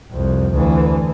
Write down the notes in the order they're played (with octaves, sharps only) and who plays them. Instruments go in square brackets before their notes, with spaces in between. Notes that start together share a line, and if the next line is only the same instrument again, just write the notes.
[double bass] C2 F2
D2 E3